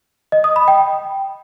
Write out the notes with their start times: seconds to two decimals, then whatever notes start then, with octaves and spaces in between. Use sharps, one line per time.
0.32 D#5
0.44 D#6
0.56 B5
0.68 G5